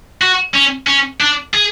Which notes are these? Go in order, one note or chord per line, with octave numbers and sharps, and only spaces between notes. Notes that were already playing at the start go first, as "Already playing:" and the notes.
F#4
C#4
C#4
D4
G#4